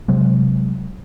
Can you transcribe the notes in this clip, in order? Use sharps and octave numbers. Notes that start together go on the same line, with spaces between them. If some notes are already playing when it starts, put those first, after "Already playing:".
C3 F#3 G#3